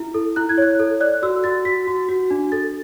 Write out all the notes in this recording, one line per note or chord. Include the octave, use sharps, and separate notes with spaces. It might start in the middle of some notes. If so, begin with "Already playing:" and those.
Already playing: E4
A4
E4 F#6
G#6
C#5 F#6
A4
D5 F#6
F#4 E6
F#4 A6
F#4 B6
F#4
F#4
D4
A4 A6